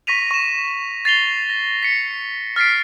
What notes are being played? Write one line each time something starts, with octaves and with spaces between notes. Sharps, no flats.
C#6 A#6 B6 D#7 F7
C#6 E7
A6 C7 F7 G7
A#6
B6 C#7
F6 A6 B6 C7 D7